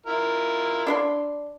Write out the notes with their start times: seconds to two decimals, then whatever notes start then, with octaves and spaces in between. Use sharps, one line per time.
0.06 E4 F4 A#4
0.87 D4 B5 C6